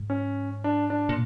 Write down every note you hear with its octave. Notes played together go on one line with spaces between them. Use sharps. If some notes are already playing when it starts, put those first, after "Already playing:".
Already playing: G#2
C#4
D4
D4
A#2